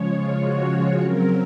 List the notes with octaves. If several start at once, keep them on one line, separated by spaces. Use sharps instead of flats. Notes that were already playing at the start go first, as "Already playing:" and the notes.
Already playing: C#3 F3 G#3 C#5
F4
F#4
C#3 F#3 C4 A#4